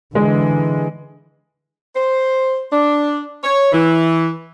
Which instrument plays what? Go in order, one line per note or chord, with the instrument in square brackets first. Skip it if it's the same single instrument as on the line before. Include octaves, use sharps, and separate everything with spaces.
[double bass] D3 E3 [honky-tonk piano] G#3
[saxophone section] C5
D4
C#5
E3